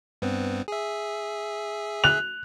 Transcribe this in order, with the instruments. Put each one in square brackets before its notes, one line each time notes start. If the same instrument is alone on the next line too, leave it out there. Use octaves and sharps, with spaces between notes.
[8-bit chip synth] G2 B3 C4
G#4 E5
[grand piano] F#6 F7